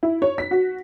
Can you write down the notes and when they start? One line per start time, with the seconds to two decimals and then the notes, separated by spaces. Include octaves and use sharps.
0.03 E4
0.22 C#5
0.38 B6
0.51 F#4